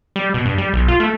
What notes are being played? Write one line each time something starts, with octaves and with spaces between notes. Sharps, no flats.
G3
B2
G2
G3
B1
F4
A3